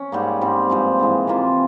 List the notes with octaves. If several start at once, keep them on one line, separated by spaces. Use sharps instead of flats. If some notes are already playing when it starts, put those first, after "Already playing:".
Already playing: C#4
G#2 G3 A#3
G#2 G3 C4
G2 F3 G#3
G#2 E3 G#3
C3 E3 A#3 F4